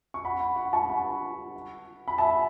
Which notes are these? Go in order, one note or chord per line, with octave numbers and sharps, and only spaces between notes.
C#6
F#5 B5
F#5
F#5
A5 C#6
F#5 B5
B5
E5 A5